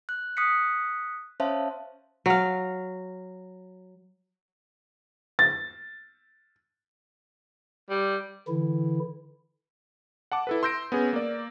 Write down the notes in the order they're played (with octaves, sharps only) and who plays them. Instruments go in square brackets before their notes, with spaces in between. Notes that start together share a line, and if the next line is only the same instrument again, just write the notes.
[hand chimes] F#6
D#6 F#6 B6 C#7
C#4 C5 C#5 E5 F5 A5
[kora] F#3 F5
[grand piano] A6
[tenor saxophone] G3
[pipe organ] D3 E3 E4
[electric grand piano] F#5 A5 D6
E4 A4 B4
C6 E6 G6 A#6 D7
B3 C#4 G#4
A#3 D5